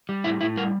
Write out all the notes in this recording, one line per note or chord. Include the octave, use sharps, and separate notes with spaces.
G3
A2 E4
A2 E4
G3 A#4